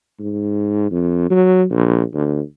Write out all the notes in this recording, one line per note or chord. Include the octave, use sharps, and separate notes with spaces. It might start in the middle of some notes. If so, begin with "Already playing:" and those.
G#2
F2
F#3
A#1
D2